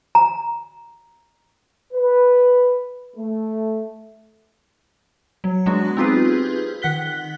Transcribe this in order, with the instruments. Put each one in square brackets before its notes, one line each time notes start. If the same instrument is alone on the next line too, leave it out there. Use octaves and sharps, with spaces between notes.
[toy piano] A#5
[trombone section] B4
A3
[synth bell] F#3
F#3 G#3 B3 D4 F#4
C4 D#4 F4 G4 G#4 B4
D#3 F#5 F#6 B6 G7